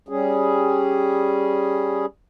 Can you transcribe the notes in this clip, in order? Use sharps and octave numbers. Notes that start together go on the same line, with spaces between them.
G3 C#4 G#4